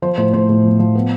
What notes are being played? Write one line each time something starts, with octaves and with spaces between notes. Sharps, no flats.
F3 C5
A2 C5
A2 C5
A2
F3
F3
B3